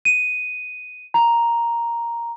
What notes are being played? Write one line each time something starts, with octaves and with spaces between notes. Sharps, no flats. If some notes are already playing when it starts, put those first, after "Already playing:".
D#7
A#5